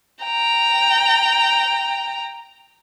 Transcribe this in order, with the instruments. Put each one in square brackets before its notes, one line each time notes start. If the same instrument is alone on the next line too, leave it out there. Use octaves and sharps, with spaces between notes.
[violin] G5 A#5